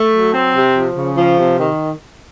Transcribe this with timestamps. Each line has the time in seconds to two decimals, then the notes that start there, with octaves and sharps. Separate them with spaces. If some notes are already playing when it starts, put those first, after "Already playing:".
Already playing: A3
0.13 F#3
0.34 C4
0.55 C3
0.75 F3
0.97 C#3
1.17 F3
1.38 C3
1.59 D#3